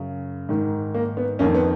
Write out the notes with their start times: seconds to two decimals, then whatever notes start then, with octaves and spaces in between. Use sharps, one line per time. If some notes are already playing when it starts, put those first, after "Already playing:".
Already playing: F#2 C#3
0.49 G#2 D#3
0.94 A#3
1.17 B3
1.39 F2 A#3 C#4
1.43 D#3
1.54 B3